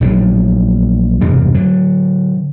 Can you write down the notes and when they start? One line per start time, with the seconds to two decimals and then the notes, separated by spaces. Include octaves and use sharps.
0.01 A#1 A2 F#3
1.21 E1 G2 C3
1.54 D3 F#3